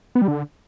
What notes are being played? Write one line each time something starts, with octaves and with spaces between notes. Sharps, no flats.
B3
G3
D3